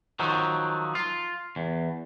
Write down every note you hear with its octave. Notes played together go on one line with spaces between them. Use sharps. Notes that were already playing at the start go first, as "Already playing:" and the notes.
D#3 F3 F#3
F4
E2